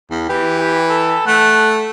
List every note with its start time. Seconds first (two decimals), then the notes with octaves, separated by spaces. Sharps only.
0.11 E2
0.29 E3 G4
0.59 G4
0.90 A4
1.27 A3 F#5